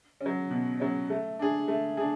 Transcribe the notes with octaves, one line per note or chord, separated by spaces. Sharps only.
C#4
F#3
B2
F#3 C#4
A3
D4 G#4
A3
D4 G#4